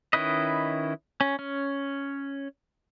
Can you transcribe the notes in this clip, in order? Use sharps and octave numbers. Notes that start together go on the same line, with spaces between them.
D#3 C#4 E4 B4 D#5
C#4
C#4